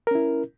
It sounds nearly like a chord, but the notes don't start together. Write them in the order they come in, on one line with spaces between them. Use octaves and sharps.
A#4 C#4 E4